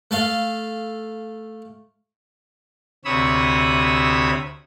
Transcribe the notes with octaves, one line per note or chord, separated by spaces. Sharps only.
A3 A4 F5
D2 C3 C#5 B5 D#6 E6